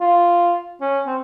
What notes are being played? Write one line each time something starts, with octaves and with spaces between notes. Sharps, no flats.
F4
C#4
C4